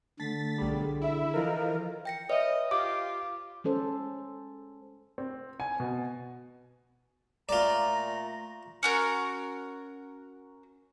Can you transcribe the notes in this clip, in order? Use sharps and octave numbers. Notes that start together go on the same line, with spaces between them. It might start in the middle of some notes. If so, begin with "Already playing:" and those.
D3 A3 A6 B6
B1 G3 G#4
E4 E5
E3 F3 A4 A#4 D#5 F5
G5 A#6 C#7
B4 C#5 D#5 E5
F4 G4 F5 D6
G#3 C#4 A4 C5
C4
G#5
B2
A#2 A3 F4 D5 A#5
C#4 F#4 A#4